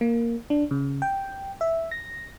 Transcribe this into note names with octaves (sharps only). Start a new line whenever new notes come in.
A#3
D4
C#3
G5
E5
A#6